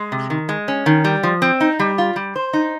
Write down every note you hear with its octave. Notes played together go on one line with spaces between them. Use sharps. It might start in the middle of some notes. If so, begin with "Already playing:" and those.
Already playing: G#3
C3
D#3
G#3
C#4
D#3
G3
F3
C4
D#4
G3
F4
G3
C5
D#4